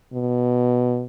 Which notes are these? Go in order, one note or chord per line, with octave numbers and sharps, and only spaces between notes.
B2